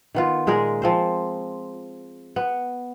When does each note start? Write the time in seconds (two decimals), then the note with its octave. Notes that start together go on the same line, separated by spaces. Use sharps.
0.15 D#3 B3 F4
0.47 A#2 G#3 G#4 A#4
0.82 F3 C4 C5
2.36 B3